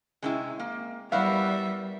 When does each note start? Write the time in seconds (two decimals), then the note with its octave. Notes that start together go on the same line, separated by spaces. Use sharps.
0.22 C3 G#3 C4 C#4 E4
0.59 A#3
1.12 G3 B3 E4 F#4 A#4 C5 E5 F5